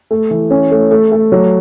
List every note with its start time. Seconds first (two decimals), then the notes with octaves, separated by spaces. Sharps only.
0.11 A3
0.31 E3
0.50 C#4
0.71 A3
0.91 A3
1.12 A3
1.32 F#3